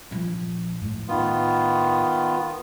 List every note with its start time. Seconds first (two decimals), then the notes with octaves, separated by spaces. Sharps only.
0.11 A#1 F3
0.82 A2
1.08 D#3 B3 F4